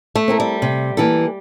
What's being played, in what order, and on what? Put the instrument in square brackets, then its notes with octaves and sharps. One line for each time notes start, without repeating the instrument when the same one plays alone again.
[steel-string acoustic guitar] A3
[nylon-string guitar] C4 E4 A#4
[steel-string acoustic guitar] G3
[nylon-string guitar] C3
E3 A#3 E4 A4